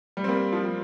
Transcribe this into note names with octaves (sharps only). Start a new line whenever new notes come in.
G3
C4
G3 A#3
F3
G3